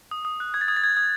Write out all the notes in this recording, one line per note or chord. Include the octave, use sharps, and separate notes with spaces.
D#6
D#6
F#6
D#6 G#6
A6
D#6 G#6
A6
D#6 G#6
D#6 G#6